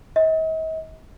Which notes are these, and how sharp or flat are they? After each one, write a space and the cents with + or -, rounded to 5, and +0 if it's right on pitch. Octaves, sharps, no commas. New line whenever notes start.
D#5 +45